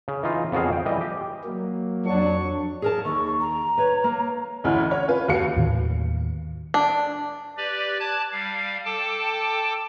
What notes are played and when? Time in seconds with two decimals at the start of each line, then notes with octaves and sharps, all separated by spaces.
0.08 C#3
0.23 E3 D#4 F4
0.52 F2 C#3 B3 F#4 G#4 F5
0.73 G5
0.86 E3 G3 D#5
1.01 G4
1.44 F#3 A#3
2.06 F2 F#3 D4 C#6
2.82 G#4 A#4 A5
3.05 D#2 C#6
3.40 A#5
3.78 B4 C#5
4.04 A#3
4.64 A1 D2 C#4 E4 F6
4.91 C#5
5.08 C#4 F4 B4
5.28 D#2 F#4 F5 C#7
5.56 D#2 A2 D#3
6.74 D4
7.57 G4 B4 D5
8.00 A5 D6 F#6 G#6
8.32 G3 F5
8.85 A4 G5 A5 D6